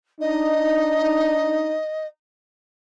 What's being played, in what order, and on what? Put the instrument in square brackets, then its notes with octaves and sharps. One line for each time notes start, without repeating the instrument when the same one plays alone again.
[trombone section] D4 D#4 [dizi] D#5